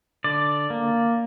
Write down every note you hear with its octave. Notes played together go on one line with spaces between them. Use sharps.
D3 D5
A#3